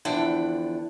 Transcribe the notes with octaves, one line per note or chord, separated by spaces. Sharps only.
E2 D3 E3 F3 D4 G5